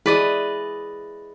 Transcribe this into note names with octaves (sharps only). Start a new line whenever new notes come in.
E4 G#4 B4 D5 D#5